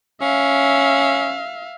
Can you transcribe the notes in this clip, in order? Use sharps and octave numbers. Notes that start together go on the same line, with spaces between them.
C#4 E5 F5